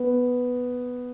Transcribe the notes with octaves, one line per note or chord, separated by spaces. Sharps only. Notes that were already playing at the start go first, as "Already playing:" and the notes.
Already playing: B3